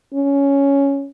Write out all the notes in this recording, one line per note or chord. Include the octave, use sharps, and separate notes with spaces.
C#4